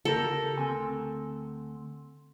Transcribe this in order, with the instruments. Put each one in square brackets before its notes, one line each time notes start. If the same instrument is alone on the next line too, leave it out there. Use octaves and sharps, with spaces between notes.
[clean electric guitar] C#3 G4 A#4 [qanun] A4
[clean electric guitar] D2 C4 G#5